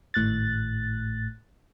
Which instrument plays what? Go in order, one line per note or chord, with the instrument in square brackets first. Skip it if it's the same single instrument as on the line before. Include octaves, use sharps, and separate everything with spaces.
[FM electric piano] G#1 A2 F#6 A6